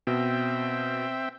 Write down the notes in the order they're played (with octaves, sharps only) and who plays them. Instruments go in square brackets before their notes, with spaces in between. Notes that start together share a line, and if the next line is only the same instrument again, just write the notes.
[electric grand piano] B2 [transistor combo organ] C4 E5 G5